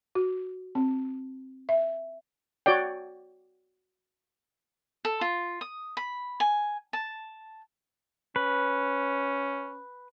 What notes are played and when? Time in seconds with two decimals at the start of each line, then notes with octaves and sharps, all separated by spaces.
0.15 F#4
0.75 C4
1.69 E5
2.66 F#4 C#5 D5 G5
5.05 A4
5.21 F4
5.61 D#6
5.97 B5
6.40 G#5
6.93 A5
8.36 C#4 B4